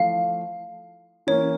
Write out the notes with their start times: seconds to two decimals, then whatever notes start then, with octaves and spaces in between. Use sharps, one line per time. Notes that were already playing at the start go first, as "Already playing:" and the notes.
Already playing: F3 A3 E4 F5
1.27 E3 A#3 C#4 C#5